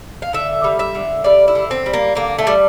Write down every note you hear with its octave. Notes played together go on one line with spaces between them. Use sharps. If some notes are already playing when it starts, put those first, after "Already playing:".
F5
D3 E5
G3
E5
D3
G3 D5
E4
D3
C4
G3
A#3
D3 A#3
A3
G3